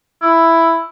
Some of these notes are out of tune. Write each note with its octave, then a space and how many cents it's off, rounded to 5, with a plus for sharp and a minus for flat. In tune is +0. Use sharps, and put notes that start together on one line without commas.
E4 +5